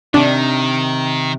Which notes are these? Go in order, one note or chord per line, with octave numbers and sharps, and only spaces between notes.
C3 D#3 D4